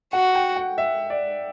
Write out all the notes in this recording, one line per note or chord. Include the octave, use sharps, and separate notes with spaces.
F#4 F#5
G5
F#5
E5
D5